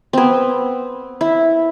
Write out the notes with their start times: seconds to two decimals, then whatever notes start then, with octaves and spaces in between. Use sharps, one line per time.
0.13 B3 C4
1.21 E4